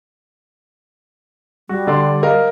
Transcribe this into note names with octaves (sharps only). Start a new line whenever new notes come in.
G3 F#4
D3 D5 C6
A#4 D#5 F5